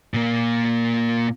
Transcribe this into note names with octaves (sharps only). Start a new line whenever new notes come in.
A#2 A#3